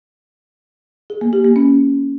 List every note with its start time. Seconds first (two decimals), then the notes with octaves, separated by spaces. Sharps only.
1.10 G#4
1.21 A#3
1.33 G4
1.44 A#3
1.56 C#4